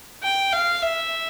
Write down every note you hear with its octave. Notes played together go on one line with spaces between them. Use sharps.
G5
F5
E5